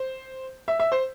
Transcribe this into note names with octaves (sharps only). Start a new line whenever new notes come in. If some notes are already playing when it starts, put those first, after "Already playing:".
Already playing: C5
E5
E5
C5